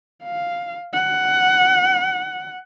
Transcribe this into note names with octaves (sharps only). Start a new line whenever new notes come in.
F5
F#5